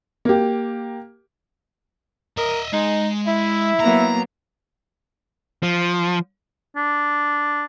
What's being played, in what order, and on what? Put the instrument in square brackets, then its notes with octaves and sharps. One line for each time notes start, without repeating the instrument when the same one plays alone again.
[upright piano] A#3 G4
[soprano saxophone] A#4 [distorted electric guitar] D#5 E5
[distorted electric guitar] G#3 [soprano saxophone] D#4
[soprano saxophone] E4 [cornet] E5
[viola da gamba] F#3 A#3 B3 [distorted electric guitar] A#5
[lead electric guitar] F3
[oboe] D4